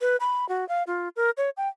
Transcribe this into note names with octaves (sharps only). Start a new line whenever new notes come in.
B4
B5
F#4
F5
F4
A#4
C#5
G5